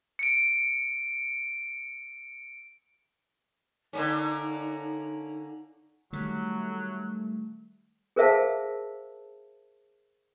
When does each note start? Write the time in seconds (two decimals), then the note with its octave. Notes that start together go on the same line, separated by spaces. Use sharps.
0.19 C#7 D7
3.93 D3 A#3 C#4 D#4
6.13 D#3 F#3 G3 A3
8.16 G#4 A#4 C5 E5 F5 A5